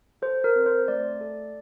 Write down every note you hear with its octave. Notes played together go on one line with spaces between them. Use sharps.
A4 C5
A#4
C4
C5
A3 D5
A4